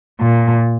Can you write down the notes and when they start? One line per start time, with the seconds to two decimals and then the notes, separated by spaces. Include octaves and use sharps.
0.21 A#2